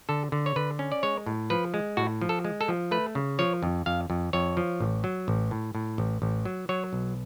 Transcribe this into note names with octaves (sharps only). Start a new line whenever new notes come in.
D3 A4
D3
C#5
D3 B4
C#4
D5
G#3 C#5
A2
F3 B4
G#3
A2 F#4
F3
A4
G#3
A4
F3
A3 B4
C#3
F3 C#5
F2
F2 F5
F2
F2 C#5
F3
A1
F#3
A1
A2
A2
A1
A1
F#3
F#3 C#5
B1